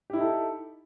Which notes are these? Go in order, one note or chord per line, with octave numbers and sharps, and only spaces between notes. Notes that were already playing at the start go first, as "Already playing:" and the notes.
D#4 E4 G4 A4